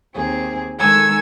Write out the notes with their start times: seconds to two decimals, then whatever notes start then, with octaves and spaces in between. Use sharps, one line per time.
0.16 D#2 C4 G#4
0.80 D#3 G#3 A4 G#5 E6 G#6